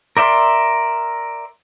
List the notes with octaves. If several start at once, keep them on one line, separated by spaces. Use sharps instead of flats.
A#4 D5 E5 C6